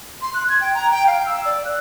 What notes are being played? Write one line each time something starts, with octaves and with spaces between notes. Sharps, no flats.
C6
F#6
G#6
G5
A#5
G5
F5
E6
D5
F#6